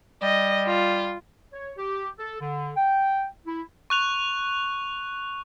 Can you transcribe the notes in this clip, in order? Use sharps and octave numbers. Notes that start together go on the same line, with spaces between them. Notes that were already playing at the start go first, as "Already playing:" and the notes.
G3 D#5
F4
C#5
G4
A4
D3
G5
E4
C#6 F#6 F7